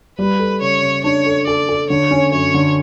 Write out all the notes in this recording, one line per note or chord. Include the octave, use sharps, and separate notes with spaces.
G3 B4
A4
C#3 C#5
C#3
D4 C#5
A4
A4 D5
A4
D3 C#5
C#4
F#2 C#5
D3